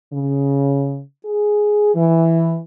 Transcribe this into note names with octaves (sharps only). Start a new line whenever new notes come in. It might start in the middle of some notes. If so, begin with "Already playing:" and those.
C#3
G#4
E3